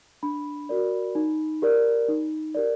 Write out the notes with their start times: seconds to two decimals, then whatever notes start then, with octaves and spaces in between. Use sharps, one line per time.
0.23 D4 B5
0.69 F#4 A#4 D5
1.15 D#4
1.62 G4 A#4 D5
2.08 D#4
2.55 G4 A#4 D5